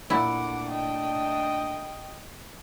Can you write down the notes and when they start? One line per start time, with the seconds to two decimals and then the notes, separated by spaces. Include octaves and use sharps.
0.10 A#2 A3 D4 E4 F#5 D6
0.70 D#5 G5